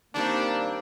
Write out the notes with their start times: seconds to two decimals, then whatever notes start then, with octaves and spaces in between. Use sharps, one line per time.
0.15 D#3 G3 A#3 C4 D4